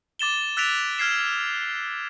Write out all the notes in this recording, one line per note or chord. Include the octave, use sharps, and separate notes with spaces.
D6 A6 E7 G7
E6 F#6 A6 B6 D7 F7
F6 G#6 C7 E7